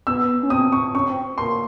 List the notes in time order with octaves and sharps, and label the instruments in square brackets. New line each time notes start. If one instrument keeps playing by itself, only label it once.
[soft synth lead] B3 [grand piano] E6
[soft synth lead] C#4
[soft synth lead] C4 [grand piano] D#6
[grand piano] C#6
[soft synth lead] C#4 [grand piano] C#6
[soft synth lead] C4
[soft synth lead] A#3 [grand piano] C6